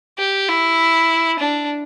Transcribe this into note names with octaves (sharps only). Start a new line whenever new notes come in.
G4
E4
D4